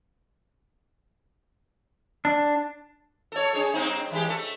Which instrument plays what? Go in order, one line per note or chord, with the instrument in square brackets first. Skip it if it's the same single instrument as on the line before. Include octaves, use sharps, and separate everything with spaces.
[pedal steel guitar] D4
[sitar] A4 C#5
D4 G#4 C#5
G2 C4 D#4
E3 G#3 G4
A3 A4